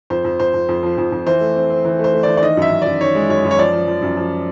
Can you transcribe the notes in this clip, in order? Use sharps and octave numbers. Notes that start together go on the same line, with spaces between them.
F2 C5
F2
F2 C5
F2
F2
F3
F2
F2
E3 C5
A3
C4
C4
E3
A3 C5
A3
E3 D5
D5
D#3 D#5
F#2 E5
F#2
F#2 D5
D#3 C#5
G#3
F#2 C#5
F#2
C#5
F3 D5
F3
F3
F#2
F3